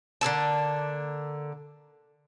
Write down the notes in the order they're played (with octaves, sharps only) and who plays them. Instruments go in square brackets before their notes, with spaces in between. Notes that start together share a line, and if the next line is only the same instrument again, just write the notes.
[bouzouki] D3 A#3 A4 A5